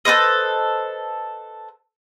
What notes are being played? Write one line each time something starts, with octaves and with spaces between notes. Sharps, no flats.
A4 B4 C5 D#5